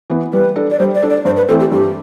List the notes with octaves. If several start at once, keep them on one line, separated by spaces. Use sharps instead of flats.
E3 B3
G3 B4
D4 A4
D5
G3 C5
D5
D4 A4
D5
G2 C5
B4
E3 A3 C4 A4
G4
G2 G4